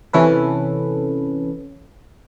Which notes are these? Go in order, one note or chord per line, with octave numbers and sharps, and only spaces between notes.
C3 E3 C#4 A4 B4